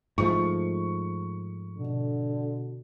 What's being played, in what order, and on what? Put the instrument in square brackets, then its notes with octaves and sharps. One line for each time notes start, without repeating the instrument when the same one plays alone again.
[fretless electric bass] G#2 F3 A3 [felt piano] C#6
[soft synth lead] B2 [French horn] D3